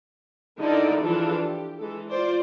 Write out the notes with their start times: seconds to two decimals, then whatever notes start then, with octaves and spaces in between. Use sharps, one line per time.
0.58 D3 D#4 E4 A4 A#4 D5
1.01 E3 F3 D4 F4 G#4 A4
1.41 G4
1.79 E3 G#3 A4
2.09 F4 C5 D5